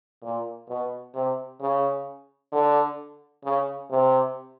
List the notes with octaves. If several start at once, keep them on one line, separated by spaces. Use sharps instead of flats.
A#2
B2
C3
C#3
D3
C#3
C3